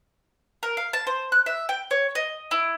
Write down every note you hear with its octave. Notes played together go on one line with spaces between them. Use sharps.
A#4
F5
A5
C5
F#6
E5
G5
C#5
D#5
E4